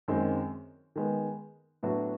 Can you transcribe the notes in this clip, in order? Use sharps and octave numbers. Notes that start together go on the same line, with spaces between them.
F#2 D#3 G#3 C4
D#3 G#3 B3
A2 F#3 B3 D4 F#4